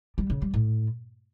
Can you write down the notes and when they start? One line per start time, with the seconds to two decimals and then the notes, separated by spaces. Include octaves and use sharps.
0.18 G3
0.30 C#3
0.42 G3
0.54 A2